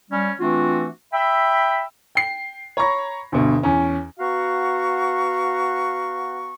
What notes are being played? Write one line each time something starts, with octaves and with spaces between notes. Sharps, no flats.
G3 C#4
E3 A3 C4 D4 F4 F#4
E5 G5 B5
G5 C7
C#5 A#5 B5 C#6 A#6
D2 G2 B2
E2 C#4
B3 F#4 F5 F#5 A#5 C#6